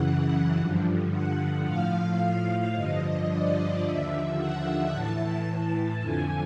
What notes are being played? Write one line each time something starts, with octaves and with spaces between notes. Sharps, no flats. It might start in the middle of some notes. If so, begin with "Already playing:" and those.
Already playing: F#2 C#3 E3 F#5
G2 D3 F3
F#5
A2 F3 F5
G2 D3 F3 D#5
D5
D#2 D3 F3 E5
F#5
A2 E3 A5
A5
F2 D3 F3 G#5